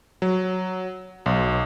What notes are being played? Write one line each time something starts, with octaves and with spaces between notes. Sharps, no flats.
F#3
B1